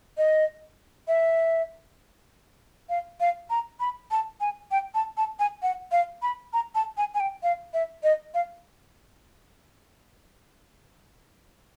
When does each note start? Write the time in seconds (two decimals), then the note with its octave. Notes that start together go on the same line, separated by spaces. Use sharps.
0.18 D#5
1.08 E5
2.89 F5
3.20 F5
3.50 A#5
3.80 B5
4.11 A5
4.40 G#5
4.71 G5
4.95 A5
5.17 A5
5.39 G#5
5.62 F#5
5.92 F5
6.22 B5
6.53 A#5
6.75 A5
6.97 G#5
7.15 G#5
7.20 G5
7.43 F5
7.74 E5
8.03 D#5
8.34 F5